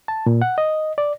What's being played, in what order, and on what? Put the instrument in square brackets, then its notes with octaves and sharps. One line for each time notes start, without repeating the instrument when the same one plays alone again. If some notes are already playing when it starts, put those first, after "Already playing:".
[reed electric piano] A5
A#2
F#5
D#5
D5